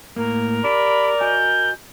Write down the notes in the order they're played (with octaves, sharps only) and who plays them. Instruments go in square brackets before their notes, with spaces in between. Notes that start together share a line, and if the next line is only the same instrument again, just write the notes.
[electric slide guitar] A2 A#3 [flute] A#4
[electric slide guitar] G4 [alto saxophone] D5 [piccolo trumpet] B5
[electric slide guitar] F#4 D#5 G#5 [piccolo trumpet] G6